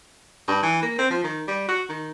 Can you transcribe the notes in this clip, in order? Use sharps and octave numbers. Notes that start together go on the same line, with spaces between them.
G2
E3
A#3
C4
F3
D#3
G3
F#4
D#3